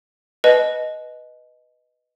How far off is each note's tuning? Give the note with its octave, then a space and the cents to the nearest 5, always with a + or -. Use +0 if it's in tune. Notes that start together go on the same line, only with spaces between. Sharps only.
B4 +0 D#5 +0 A5 -40